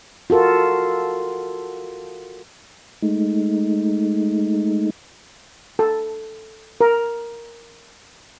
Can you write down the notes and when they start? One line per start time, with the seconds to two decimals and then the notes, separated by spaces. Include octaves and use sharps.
0.30 F4 F#4 A4 A#4
3.02 G#3 A3 D#4
5.79 A4
6.81 A#4